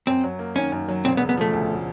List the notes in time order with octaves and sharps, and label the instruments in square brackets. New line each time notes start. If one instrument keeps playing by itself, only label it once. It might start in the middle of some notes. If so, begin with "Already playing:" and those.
[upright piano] F#2 [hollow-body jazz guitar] C4
[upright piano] F#3
A#3
[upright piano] D#3 [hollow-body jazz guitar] C#4
[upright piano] F#2
F#3
[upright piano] E1 [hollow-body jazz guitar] C4
[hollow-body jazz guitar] B3
[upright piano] C#3
[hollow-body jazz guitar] B3
[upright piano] F3 [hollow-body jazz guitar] A3
[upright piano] D2